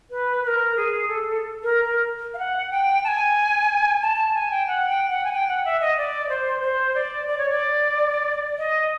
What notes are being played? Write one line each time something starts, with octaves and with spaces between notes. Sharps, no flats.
B4
B4
A#4
G#4
A4
A#4
A#4
F5
F#5
G5
A5
G#5
A5
A5
G#5
G5
F#5
G5
F#5
G#5
G5
F#5
E5
D#5
D5
C5
C5
D5
D5
C#5
D5
D#5